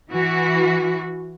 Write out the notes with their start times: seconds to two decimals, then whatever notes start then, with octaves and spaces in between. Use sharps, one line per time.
0.10 E3 F#4